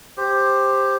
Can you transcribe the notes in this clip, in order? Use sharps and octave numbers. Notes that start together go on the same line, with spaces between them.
G4 C5